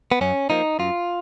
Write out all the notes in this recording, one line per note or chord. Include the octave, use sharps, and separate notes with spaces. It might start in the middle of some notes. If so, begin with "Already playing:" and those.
B3
F#2 C#4
F3 A#3 D#4
F#2 F4